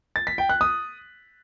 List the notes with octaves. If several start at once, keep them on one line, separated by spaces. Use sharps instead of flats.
A6
B6
G5
F#6
D#6